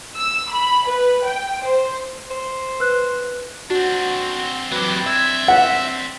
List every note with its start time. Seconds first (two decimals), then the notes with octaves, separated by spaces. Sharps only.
0.20 E6
0.52 B5
0.89 B4
1.26 G5
1.64 C5
2.31 C5
2.80 B4 F#6
3.70 C4 D4 F#4
4.72 F#3 G4 B4
5.07 E5 G#6
5.48 F#5 B6